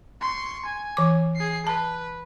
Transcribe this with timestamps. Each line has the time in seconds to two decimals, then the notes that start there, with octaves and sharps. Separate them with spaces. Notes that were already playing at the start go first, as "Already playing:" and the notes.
0.21 C6 C#6
0.66 G#5
0.97 E3 D6
1.36 G#4 C7
1.67 B4 A5